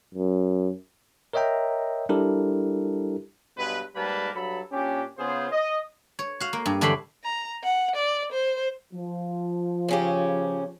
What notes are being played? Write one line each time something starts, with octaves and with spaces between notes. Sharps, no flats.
F#2
A#4 C#5 D#5 E5 G5 A#5
G3 D4 E4 G4 A4 A#4
G2 B2 F#3 G#3 B4
G#2 G3 A#3 B4 A5 B5
G2 F#3 A4 B5
A#2 C#4 D4 G4
C#3 B3 F4 G#4 C5
D#5
C#5
F#4 F5
A#3
G2
E2 D3 D4 C#5 B5 C6
A#5
F#5
D5
C5
F3
C#3 C#4 G4